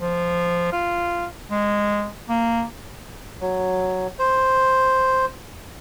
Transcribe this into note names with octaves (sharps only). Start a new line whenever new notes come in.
F3
F4
G#3
A#3
F#3
C5